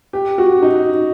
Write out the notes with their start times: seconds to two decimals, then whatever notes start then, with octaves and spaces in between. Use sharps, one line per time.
0.13 G4
0.38 F#4
0.62 D#4